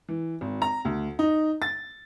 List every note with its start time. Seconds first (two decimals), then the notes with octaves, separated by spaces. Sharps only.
0.09 E3
0.41 G#1
0.62 A#5
0.85 D2
1.19 D#4
1.62 A6